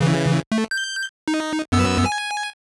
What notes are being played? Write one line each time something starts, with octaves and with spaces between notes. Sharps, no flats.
C#3 E3
A3
G6
D#4
F#2 B3 E6
G#5